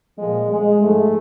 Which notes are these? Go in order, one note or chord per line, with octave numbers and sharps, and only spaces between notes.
A#2 F3 G#3
G#3
G#2 F3 A3